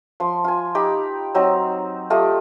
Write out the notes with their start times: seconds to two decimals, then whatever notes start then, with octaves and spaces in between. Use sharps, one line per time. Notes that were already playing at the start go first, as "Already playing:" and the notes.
0.20 F3 C6
0.44 F4 G#5
0.75 D#4 G4 B5 D6
1.35 F#3 C4 D#4
2.10 A3 F4 G4 D#5